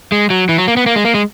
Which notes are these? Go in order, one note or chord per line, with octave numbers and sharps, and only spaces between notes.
G#3
F#3
E3
F#3
A#3
B3
A#3
G#3
A#3
G#3